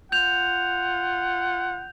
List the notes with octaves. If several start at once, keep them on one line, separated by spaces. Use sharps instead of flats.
F4 F#5 G6 F7